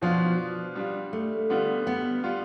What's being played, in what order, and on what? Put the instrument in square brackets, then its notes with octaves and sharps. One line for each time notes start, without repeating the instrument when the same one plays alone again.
[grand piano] B2 B3 D4 F4 [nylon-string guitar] F3
[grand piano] G3 D4 F4
[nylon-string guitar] A3
[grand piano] D3 G3 B3 F4
[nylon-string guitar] B3
[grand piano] G3 B3 F4